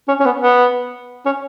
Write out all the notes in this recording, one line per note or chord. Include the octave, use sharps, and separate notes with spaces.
C#4
C#4
B3
B3
C#4